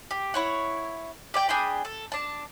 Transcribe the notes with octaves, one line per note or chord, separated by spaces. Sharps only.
G4
E4 C#5 F#5
G4 D5 G5
D4 G#4 G5 B5
A4
D4 A5